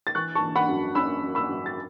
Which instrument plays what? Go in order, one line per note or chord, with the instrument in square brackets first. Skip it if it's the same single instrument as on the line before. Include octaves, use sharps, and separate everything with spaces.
[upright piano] A6
E3 C#6 F#6
A5 C#6
E3
F#5 B5
F#2
C#4 B5 E6
F#2
B5 E6
F#2
A6